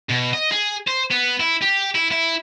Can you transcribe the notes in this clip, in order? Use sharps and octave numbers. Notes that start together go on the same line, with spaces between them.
B2
D#5
G#4
C5
B3
E4
G4
E4
E4